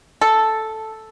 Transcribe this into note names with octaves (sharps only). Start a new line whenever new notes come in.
A4